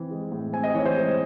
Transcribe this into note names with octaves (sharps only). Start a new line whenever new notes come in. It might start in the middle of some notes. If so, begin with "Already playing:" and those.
Already playing: E3 C4
G#3
A2
C4 G#5
D#5
E3 C#5
C5
G#3